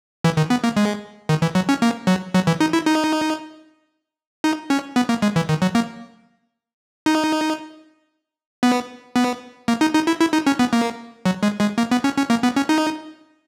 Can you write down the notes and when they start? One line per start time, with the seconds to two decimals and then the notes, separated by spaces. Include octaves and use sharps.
0.24 E3
0.37 D#3
0.50 B3
0.64 A#3
0.76 G#3
1.29 D#3
1.42 E3
1.55 F#3
1.69 C#4
1.82 A#3
2.07 F#3
2.34 F#3
2.47 E3
2.60 D#4
2.73 E4
2.86 D#4
4.44 D#4
4.70 C#4
4.96 B3
5.09 A#3
5.22 G#3
5.36 E3
5.49 D#3
5.62 F#3
5.75 A#3
7.06 D#4
8.63 B3
9.16 B3
9.68 A#3
9.81 D#4
9.94 D#4
10.07 E4
10.20 E4
10.33 D#4
10.47 C#4
10.59 B3
10.73 A#3
11.25 F#3
11.43 G#3
11.61 G#3
11.78 A#3
11.91 B3
12.04 C#4
12.17 C#4
12.30 A#3
12.43 B3
12.56 C#4
12.69 D#4